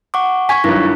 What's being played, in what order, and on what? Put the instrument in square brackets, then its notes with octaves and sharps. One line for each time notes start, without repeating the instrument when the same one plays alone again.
[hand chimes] F#5 C#6 D6
[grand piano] G#5 [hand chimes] C#6 G#6 B6
[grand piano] G2 D#3 F#3 [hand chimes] E4 F4